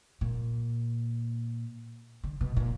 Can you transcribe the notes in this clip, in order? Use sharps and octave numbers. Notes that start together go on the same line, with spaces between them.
A#2
D3
B2
A#2